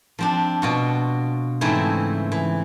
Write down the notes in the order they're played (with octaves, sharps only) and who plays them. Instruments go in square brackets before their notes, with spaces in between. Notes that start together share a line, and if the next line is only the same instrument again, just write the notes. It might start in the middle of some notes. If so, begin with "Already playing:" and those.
[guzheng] F3 C4 D4
B2 F4 F#4
G#2 C#3 E3 A3 C4 E4
E3